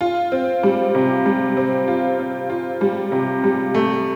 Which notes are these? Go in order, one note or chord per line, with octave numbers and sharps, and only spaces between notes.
F4
C4
G3
C3
G3
C4
F4
C4
F4
G3
C3
G3
A3